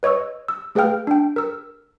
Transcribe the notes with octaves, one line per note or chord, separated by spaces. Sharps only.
B4 C#5 D#5 C#6 E6
E6
A3 G#4 B4 F5 G5 F6
D4 G5
A#4 E6